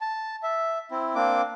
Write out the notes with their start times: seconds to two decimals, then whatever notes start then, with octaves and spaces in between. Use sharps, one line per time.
0.01 A5
0.43 E5
0.91 C4 E4
1.15 A#3 C4 D4 D6